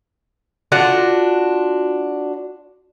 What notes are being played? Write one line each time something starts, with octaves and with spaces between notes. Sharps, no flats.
D4 F4 F#4